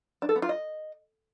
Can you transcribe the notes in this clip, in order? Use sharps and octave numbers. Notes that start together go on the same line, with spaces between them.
D4
A4
B3
F4
D#5